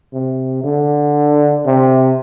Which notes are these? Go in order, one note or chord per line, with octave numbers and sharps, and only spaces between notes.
C3
D3
C3